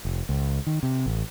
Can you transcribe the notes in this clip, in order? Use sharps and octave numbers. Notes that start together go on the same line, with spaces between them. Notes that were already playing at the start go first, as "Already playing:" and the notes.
F1
C#2
D#3
C3
A1